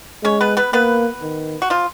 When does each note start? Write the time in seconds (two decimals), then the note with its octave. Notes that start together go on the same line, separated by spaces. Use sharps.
0.24 G#3 C#4 C#5
0.41 B3 B4
0.57 B3 B4
0.73 A#3 B3 B4
1.22 D#3
1.62 F#4
1.70 F3 F4